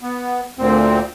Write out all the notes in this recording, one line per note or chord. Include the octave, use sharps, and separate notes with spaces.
B3
D2 A#2 C4